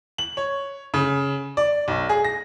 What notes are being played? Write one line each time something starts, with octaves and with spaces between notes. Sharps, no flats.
F#7
C#5
C#3
D5
B1
G#4
A#6